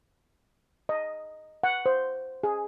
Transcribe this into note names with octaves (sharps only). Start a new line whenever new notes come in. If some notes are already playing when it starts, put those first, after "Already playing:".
D#5
F#5
C5
G#4